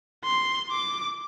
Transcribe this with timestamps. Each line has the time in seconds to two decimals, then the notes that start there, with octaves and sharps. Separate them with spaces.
0.24 C6
0.71 D6